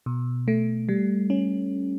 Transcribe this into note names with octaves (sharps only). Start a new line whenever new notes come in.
B2
A3
G3
C#4